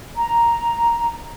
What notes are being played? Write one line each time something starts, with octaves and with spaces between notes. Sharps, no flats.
A#5